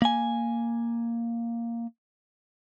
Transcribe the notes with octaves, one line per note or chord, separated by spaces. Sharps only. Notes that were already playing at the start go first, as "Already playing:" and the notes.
A#3 G#5